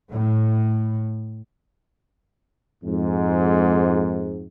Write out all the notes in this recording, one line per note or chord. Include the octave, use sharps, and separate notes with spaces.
A2
F2 G#2